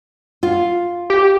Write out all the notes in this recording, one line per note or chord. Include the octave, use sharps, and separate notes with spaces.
F4
G4